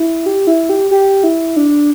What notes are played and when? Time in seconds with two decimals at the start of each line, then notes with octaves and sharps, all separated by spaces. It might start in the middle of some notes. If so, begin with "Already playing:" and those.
Already playing: E4
0.26 G4
0.47 E4
0.69 G4
0.91 G4
1.24 E4
1.56 D4